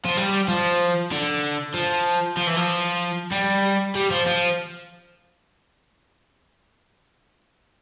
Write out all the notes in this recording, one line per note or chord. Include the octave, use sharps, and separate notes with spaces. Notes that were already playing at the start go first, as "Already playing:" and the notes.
F3
G3
F3
D3
F3
F3
E3
F3
G3
G3
F3
F3